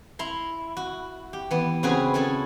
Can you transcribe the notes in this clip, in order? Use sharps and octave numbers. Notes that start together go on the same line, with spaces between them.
E4 A#5 C6
F#4
G4
E3 B3
C#3 C4 F#4 G#4 B4
C#4 E4 G#4 A4 A5